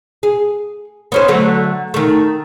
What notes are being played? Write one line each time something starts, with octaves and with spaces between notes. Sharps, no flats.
G#4
B3 C#4 C5
D3 F#3 A3
D#3 A3